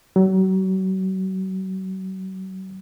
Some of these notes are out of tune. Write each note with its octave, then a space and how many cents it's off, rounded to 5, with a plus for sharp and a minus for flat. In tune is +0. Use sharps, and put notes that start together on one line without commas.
F#3 +35